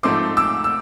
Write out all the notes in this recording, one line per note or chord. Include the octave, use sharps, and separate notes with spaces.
G#2 F3 A3 C4 D#4 C6 D6
D6 E6
E6